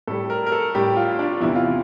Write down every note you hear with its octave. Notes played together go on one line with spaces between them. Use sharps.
A2 G3 A4
A#4
A#4
A4
A2 G3 G4
F4
D4
E2 C3 E3 E4
F4